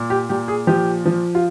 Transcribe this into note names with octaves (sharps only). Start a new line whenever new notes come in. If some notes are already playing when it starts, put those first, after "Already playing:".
Already playing: A#2
G4
A#2 G4
G#4
F3 G4
F3
F4